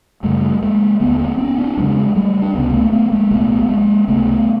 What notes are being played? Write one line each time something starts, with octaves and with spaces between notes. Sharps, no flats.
F#2 C#3 G3 A3
G#3 A#3
D#2 D3 A3 B3
A#3 C4
B3 C#4
C4 D4
E2 C#3 F#3 G#3
G3 A3
D4
C#2 C3 B3 C#4
A3 B3
A#3
A3 B3
G#3 A#3
C2 A#2 A3 B3
A3
G#3 A#3
C#2 C3 A3 B3